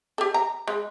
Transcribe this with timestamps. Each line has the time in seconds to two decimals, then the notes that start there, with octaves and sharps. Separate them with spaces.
0.18 G4 A4
0.34 A#5
0.68 G#3